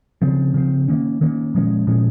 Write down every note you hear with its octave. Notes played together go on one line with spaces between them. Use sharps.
C#3 F3 C4
C#3 F3 C4
D#3 A#3 C#4
D#3 A#3 C#4
A#2 F3 G#3 C#4
A#2 F3 G#3 C#4